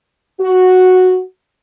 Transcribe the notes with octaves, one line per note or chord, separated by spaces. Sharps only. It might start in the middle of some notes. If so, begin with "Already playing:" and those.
F#4